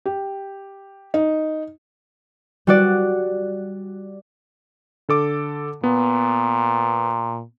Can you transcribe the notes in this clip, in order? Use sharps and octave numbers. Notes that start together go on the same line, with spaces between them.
G4
D#4
G3 F#4 D5
D3 A4 D6
A#2 B3